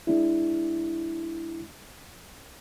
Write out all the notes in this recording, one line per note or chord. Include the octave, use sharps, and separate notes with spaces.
G#3 D4 E4